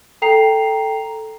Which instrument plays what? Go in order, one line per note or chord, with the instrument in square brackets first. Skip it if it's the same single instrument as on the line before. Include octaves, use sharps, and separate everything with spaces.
[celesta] A4 G5 A#5 C7 F7